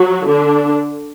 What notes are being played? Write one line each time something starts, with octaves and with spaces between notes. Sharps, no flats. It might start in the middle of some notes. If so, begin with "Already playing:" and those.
Already playing: F#3 F#4
D3 D4